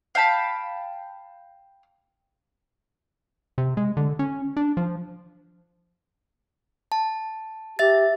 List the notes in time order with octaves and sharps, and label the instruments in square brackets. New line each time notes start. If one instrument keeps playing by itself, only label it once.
[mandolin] F5 G5 A5 B5
[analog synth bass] C3
G#3
D3
C#4
D4
F3
[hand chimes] A5
[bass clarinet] G4 [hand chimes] E5 A6